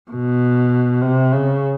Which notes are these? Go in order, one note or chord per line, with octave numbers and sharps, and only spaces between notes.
B2
C3
C#3